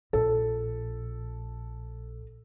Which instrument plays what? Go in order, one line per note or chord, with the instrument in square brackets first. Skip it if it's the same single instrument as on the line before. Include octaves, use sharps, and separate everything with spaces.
[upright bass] A#1 [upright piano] A4